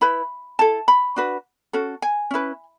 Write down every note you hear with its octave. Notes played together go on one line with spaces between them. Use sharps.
E4 B4 B5
E4 A4 A5
B5
D4 F#4 B4
C#4 F#4 A4
G#5
C#4 E4 B4